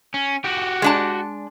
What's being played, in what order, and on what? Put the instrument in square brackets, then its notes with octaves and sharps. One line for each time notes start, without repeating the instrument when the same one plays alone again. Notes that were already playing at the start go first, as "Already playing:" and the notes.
[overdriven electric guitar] C#4
F#4 G4
[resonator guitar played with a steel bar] G#3 D4 A5